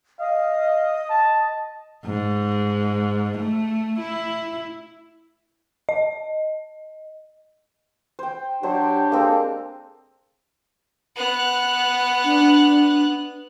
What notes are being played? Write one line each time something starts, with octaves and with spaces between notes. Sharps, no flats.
D#5 F5 D#6
A5
G#2
A3
E4
D#5
C5 G5
F#3 D4 G4 C5 A5
G#3 A#3 C4 A4
B3 F#6
D4